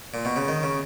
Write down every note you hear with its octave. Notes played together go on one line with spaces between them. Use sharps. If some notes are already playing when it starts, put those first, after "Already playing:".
A#2
B2
C#3
D#3
C#3